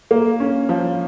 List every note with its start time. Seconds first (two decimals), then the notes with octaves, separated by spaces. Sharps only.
0.11 A#3
0.40 C#4
0.69 F3